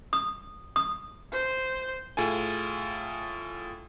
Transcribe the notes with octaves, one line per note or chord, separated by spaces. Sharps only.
D#6
D#6
C5
A2 F4 G#4 A4 G#5